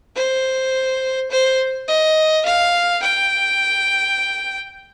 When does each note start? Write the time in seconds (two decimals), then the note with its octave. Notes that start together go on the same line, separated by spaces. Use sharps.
0.16 C5
1.31 C5
1.88 D#5
2.46 F5
3.02 G5